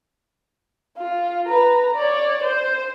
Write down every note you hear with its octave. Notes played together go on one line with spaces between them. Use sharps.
F4
B4 A#5
C#5 D5
C5